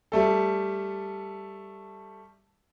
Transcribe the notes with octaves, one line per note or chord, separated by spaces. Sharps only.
G3 A3 A4